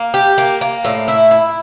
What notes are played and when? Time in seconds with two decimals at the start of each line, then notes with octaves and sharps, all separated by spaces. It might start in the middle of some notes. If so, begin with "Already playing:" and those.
Already playing: A#3
0.14 G4
0.38 A#3
0.61 A#3
0.85 A2
1.08 E4
1.31 E4